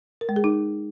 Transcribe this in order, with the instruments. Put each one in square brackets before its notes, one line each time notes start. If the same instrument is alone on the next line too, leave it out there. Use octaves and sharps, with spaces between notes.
[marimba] A#4
G#3
G#4
D#4